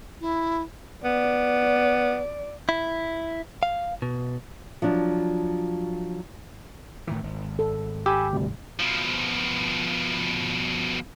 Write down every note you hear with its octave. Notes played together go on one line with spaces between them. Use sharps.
E4
B3 D5
E4
F5
B2
F3 F#3 D4
A2 D#3 E3
G#1
A4
G4 G#5 B5 E6
D2 C3 G3
B2 F3